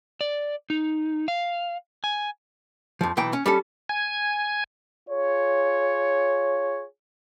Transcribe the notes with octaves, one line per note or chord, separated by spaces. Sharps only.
D5
D#4
F5
G#5
F2 F3
B1 E3 G5
C#4
G3 C#4 A4
G#5
F4 G#4 C#5